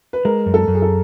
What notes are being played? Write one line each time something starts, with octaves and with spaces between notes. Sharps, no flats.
B4
G#3 A#4
F#2
A4
F#2
G#4
A4